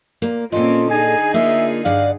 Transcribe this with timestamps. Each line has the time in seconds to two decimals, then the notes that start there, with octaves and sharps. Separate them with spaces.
0.22 A#2 A#3
0.52 A#2 A#3 C4 C#4 F4 A4 D#5
0.90 D3 D#4 G#4 G#5
1.34 A#3 F4 E5
1.85 G2 D5 F5 F#5